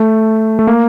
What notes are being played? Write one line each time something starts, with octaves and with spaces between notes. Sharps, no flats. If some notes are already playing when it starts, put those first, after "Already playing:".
Already playing: A3
A3
A#3